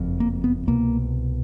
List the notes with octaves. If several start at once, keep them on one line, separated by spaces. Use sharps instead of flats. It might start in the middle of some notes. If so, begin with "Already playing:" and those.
Already playing: F#1 F2
A#3
B3
C2 B2 A#3